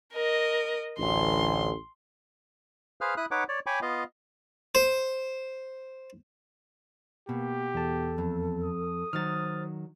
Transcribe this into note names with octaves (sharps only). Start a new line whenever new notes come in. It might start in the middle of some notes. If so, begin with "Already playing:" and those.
A#4 D#5
A1 D2 C6
G#4 B4 C5 F5 F6
E4 B5 D#6 F#6
D#4 B4 C#5 F#5 D6
C#5 D5
C#5 G5 G#5 B5 C#6 D6
B3 F4 D#5 F5
C5
B2 A#3 G4
E2 A4 A5
F2
D#6
D#3 F#3 C5 F6 A6